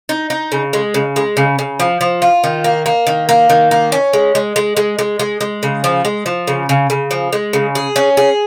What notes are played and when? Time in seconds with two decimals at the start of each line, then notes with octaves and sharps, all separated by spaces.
0.09 D#4
0.30 D#4
0.52 C#3
0.73 G#3
0.94 C#3
1.16 G#3
1.37 C#3
1.59 C#3
1.80 F3
2.01 F3
2.22 F4
2.44 D#3
2.64 A#3
2.86 A#3
3.07 D#3
3.29 A#3
3.49 D#3
3.71 A#3
3.92 C#4
4.13 G#3
4.35 G#3
4.56 G#3
4.77 G#3
4.99 G#3
5.19 G#3
5.41 G#3
5.63 C#3
5.84 F3
6.05 G#3
6.26 F3
6.47 C#3
6.69 C#3
6.90 C#3
7.11 F3
7.33 G#3
7.53 C#3
7.75 G#4
7.96 C#4
8.17 G#4